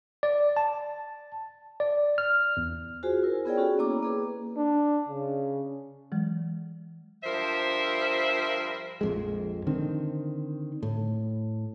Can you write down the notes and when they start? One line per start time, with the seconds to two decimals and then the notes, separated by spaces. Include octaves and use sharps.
0.23 D5
0.57 A5
1.80 D5
2.18 F6
2.57 E2
3.03 F4 F#4 G#4 C5 G#5
3.23 E4 A#4
3.45 B3 F4 G#4 C#5 D5 G5
3.57 C#4 F#4 G#4 A4
3.79 A#3 B3 E4 C#5 A#5 D6
4.03 A#3 G#4 B4
4.56 D4
5.08 C#3
6.12 E3 F#3 G#3
7.23 G2 F3 A#4 C5 E5
9.01 A#1 F2 G#3
9.67 D3 D#3 C4
10.83 A2